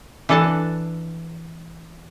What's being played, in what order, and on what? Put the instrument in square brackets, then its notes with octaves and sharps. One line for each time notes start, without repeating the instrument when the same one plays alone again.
[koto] E3 D4 A4 F#5 A5